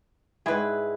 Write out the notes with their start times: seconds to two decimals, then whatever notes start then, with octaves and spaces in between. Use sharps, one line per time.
0.46 G#2 G3 E4 G#4 B4